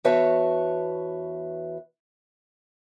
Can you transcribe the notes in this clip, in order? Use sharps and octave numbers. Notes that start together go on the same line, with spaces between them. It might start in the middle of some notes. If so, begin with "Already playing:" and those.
E2 F#4 B4 C#5 E5 A5